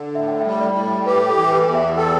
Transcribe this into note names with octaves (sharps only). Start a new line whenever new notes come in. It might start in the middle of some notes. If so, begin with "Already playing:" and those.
Already playing: D3
A2 E5
G5
E5
G3
D5
A2
G4 B4
A4
E3
B4
E2
E5
A4 G5